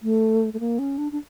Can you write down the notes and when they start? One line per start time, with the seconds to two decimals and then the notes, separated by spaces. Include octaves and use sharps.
0.03 A3
0.53 A3
0.60 A#3
0.79 C#4
0.98 D4
1.12 D4